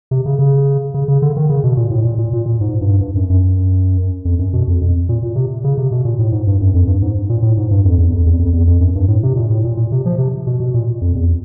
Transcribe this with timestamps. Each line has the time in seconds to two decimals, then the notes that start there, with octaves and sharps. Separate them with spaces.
0.11 C3
0.26 C#3
0.39 C#3
0.94 C#3
1.08 C#3
1.22 D3
1.37 D#3
1.49 C#3
1.64 B2
1.77 A#2
1.91 A2
2.05 A#2
2.18 A#2
2.33 A#2
2.46 A#2
2.61 G#2
2.81 G2
3.01 G2
3.15 F#2
3.30 F#2
4.25 F2
4.39 F#2
4.53 B2
4.68 F2
4.81 F2
5.09 A#2
5.23 A#2
5.35 C3
5.64 C#3
5.77 C3
5.92 B2
6.05 A#2
6.19 A2
6.32 G#2
6.47 G2
6.61 F#2
6.74 F2
6.87 G2
7.02 G#2
7.29 A#2
7.42 A2
7.57 G#2
7.71 G2
7.85 F2
7.98 E2
8.12 F2
8.26 E2
8.39 F2
8.53 E2
8.67 F2
8.80 F#2
8.95 G2
9.08 A2
9.23 C3
9.36 A#2
9.50 A2
9.64 A#2
9.77 A#2
9.92 C3
10.06 F3
10.18 C3
10.47 B2
10.60 B2
10.74 A#2
11.01 F2
11.15 E2